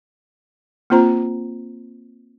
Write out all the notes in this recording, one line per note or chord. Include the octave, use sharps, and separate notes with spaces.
A#3 C4 F4 C5 A#5